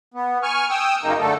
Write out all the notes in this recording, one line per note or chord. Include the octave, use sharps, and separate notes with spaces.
B3
G#5 C#6 F6
G5 D#6 E6
F#2 C#3 A#3 D#4
D3 A3 A4